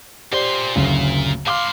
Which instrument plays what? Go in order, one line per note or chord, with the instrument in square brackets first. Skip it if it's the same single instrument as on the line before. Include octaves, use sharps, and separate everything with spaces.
[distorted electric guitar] A#2 C6 [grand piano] G4 C5 D5
[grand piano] F#1 D2 C#3
[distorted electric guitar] A2 C6 [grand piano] F5 D6 F6